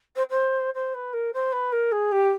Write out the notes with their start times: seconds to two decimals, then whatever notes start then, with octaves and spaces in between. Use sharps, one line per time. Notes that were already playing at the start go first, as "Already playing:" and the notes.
0.15 C5
0.30 C5
0.74 C5
0.94 B4
1.13 A#4
1.33 C5
1.52 B4
1.72 A#4
1.92 G#4
2.11 G4